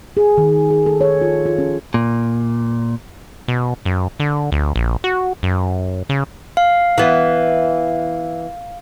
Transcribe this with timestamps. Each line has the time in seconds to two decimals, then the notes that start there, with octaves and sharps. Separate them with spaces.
0.17 G#4
0.38 D#3
0.70 G#4
0.86 A4
1.01 C#5
1.21 F4
1.46 F4
1.58 C#4
1.94 A#2
3.48 B2
3.85 F#2
4.20 D3
4.52 D2
4.76 A#1
5.04 F#4
5.43 F#2
6.09 C#3
6.57 F5
6.98 E3 B3